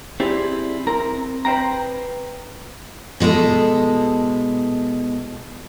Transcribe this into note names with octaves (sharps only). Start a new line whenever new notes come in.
C4 E4 G4 G#4 C5 D5
C4 A#4 A#5
B4 C5 F5 G5 A#5
B2 G#3 E4 A4